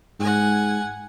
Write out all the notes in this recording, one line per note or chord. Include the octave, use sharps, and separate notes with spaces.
G#2 F#5 G#5